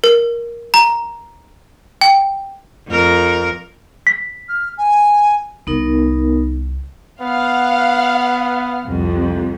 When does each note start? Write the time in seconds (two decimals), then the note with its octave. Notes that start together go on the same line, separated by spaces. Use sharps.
0.04 A#4
0.74 A#5
2.01 G5
2.88 F2 A#4
4.07 B6
4.49 F6
4.78 G#5
5.67 C2 B3 D#4 A#4
7.21 B3 F5 F#5
8.85 C2 F2